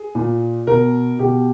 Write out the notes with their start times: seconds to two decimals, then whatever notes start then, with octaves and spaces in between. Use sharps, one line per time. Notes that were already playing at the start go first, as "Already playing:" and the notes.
Already playing: G#4
0.15 A#2
0.67 B2 A#4
1.19 B2 G4